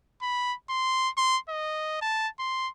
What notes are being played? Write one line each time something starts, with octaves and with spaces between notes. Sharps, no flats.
B5
C6
C6
D#5
A5
C6